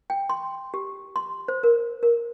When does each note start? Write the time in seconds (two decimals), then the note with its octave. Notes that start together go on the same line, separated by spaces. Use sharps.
0.10 G5
0.30 C6
0.74 G4
1.16 C6
1.48 C5
1.63 A#4
2.03 A#4